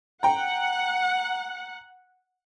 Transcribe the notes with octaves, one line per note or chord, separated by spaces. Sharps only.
F#5 G5 A#5